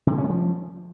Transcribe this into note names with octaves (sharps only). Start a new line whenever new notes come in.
C3
D3
C#4
G#3
F3